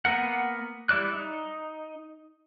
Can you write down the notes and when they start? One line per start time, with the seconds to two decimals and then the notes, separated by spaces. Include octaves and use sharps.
0.05 A#3 B3 A#4 F#5
0.89 G3 E4 D5 F#6
1.14 D#4